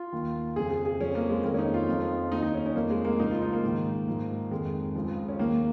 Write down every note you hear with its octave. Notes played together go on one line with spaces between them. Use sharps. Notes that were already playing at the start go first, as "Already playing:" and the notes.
Already playing: F4
D#2 D#3
F2 C#3 F3 G#4
G#4
G#4
F2 F3 C#4
A#3
G#3
F2 D#3 A#3
C#4
D#4
F4
F2 F3
D#2 D#3 D#4
D#4
C#4
C#4
F2 F3 A#3
G#3
A#3
C#2 C#3 F3 D#4
F4
D#4
A#3
G#2 D#3
G#2 F3
F2 D#3 G#3
C#2 C#3 F3
C#4
D#2 D#3 A#3